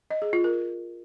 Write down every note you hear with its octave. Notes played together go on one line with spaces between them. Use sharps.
D#5
G#4
F4
A#4